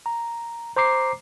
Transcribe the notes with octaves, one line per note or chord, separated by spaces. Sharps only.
A#5
C5 A#5 D6 C7